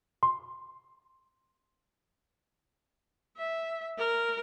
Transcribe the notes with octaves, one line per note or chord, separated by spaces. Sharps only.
C6
E5
A#4